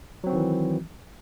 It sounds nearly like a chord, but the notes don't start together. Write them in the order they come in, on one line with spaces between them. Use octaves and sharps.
F#3 C4 F#4 D#3 E3